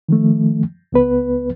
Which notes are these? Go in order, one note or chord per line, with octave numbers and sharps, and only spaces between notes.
D#3 F3 A3
C#2 B3 B4